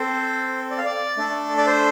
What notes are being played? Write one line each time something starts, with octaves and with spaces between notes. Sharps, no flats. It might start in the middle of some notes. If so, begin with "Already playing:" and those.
Already playing: C4 A4 C5
D5
F5
D5
A3 D4 A4
D5
C5